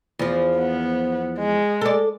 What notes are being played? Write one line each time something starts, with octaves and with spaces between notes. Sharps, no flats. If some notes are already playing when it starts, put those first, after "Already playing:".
E2 F3
B3
G#3
A4 D5